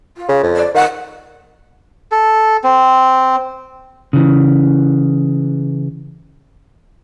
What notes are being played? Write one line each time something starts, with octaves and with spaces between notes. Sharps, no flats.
F4
C#3
F2
D5
D#3 F#5
A4
C4
C#3 E3